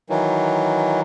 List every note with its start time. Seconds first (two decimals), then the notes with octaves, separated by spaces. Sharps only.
0.10 D#3 E3 F#3